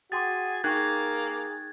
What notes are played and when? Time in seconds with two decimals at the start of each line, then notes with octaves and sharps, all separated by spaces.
0.12 F#4 G#4 G5 C6 D6 A6
0.64 A#3 D#4 G#4 G5 C#6 F#6 G#6